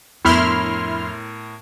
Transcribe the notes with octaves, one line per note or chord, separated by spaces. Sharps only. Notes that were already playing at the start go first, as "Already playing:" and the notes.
F2 A2 B3 D4 E4 A#4 C6 F6